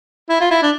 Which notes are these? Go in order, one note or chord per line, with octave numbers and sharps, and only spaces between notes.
E4
F4
E4
D4